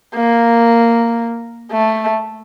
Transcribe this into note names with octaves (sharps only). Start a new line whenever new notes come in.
A#3
A3